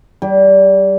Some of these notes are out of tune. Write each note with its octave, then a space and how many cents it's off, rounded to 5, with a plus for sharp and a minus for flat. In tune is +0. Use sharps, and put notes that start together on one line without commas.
G3 -25 G4 +35